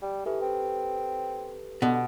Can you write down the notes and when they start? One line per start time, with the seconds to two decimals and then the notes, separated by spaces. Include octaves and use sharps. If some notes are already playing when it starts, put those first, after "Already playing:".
0.02 G3
0.26 E3 G4 A4 B4
0.42 C4
1.82 B2 D3